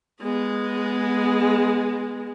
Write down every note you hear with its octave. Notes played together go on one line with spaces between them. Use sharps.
G#3 B3